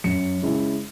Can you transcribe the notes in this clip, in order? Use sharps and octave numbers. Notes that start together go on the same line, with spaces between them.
F#2 C#7
C#3 G#3 E4